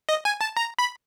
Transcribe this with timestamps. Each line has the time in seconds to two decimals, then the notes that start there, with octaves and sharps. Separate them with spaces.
0.09 D#5
0.25 G#5
0.41 A5
0.57 A#5
0.79 B5